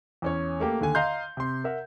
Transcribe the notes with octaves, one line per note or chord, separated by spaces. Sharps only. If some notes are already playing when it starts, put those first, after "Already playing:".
E2 C#4 C#5
A3 A#3 G4
D#2 D3 G#5
D#5 F5 A#5 C6 G6
C3 C6
A#4 E5 F#5